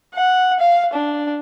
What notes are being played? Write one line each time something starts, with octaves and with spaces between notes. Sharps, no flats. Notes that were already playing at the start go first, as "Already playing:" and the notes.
F#5
F5
D4